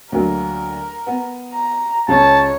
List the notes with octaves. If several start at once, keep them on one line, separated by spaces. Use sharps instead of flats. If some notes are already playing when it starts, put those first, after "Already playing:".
D2 F#3 A#3 A#4
B3
A#5
C#2 C#5 A5